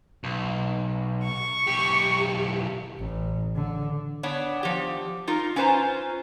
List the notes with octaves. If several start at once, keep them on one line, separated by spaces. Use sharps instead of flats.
B1
C#6
B1 G4
A1
D3
B3 D4 C#5
F3 G4
D#4 F4 A#4
C#4 F4 B4 C5 G#5 A#5